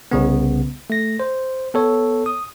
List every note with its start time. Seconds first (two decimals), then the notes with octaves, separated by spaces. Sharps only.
0.11 C2 C#3 B3
0.90 A3 A#6
1.20 C5
1.74 B3 A4 C#5
2.26 D#6